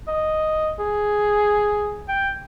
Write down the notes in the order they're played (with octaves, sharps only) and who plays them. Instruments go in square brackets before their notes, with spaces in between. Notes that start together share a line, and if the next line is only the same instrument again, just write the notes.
[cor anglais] D#5
G#4
G5